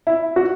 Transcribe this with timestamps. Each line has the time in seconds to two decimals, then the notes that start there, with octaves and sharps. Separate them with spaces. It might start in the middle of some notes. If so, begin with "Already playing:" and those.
0.07 E4
0.36 F#4